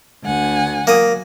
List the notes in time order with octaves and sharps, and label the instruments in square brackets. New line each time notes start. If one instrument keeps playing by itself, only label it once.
[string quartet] D2 F#5 G#5
[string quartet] F#3 [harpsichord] A#3 D#6